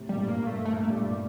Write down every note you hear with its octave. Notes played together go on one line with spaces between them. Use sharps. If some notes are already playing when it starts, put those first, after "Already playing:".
Already playing: A2 C3
G3
G2 A#2
A#3
G2
A3
A2 A3
A#3
A3
G2 A#2 G3